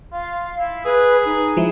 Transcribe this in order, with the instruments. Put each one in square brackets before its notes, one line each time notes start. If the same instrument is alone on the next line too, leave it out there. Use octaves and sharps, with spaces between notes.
[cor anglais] F4 [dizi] F5
[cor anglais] E4
[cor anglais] G#4 [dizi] B4
[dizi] D#4
[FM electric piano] F3 G#3 E4